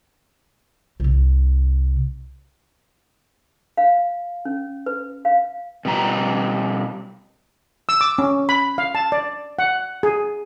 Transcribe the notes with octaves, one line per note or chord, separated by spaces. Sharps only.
C2 C3
F5
C#4
B4
F5
B2 G3 A#5
E6
D6
C#4
B5
F5
A5
D5
F#5
G#4